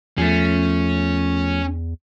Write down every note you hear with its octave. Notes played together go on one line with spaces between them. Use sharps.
E2 F3 A3 C#4